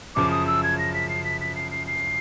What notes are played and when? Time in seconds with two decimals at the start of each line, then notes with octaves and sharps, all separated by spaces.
0.15 F#2 C#3 F3 D6
0.31 D#6
0.47 E6
0.63 G#6
0.79 A#6
0.94 B6
1.09 C7
1.24 B6
1.41 B6
1.56 C7
1.71 C7
1.87 C7